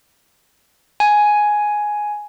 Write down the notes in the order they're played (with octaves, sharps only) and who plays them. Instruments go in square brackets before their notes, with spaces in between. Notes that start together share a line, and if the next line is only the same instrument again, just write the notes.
[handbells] G#5